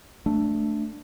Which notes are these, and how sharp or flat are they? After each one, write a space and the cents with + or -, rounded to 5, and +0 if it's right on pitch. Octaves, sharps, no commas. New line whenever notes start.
A3 +0 D4 +0